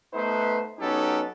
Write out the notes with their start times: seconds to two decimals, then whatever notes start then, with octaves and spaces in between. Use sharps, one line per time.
0.14 A3 B3 D#4 B4 C5
0.79 F#3 B3 C#4 D#4 G4 A4